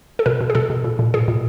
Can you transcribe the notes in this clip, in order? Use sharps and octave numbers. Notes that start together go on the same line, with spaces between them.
A4
B2 A#4
B2
G#4
B2 A4
B2
A#2
A#2
A#2 G#4
A#2